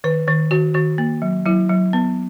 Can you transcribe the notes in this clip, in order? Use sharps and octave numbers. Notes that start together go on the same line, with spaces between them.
D#3 B4
D#3
D#3 F#4
D#3 F#4
A#3
F#3
F#3 E4
F#3
B3